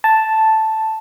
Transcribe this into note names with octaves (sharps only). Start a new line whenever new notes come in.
A5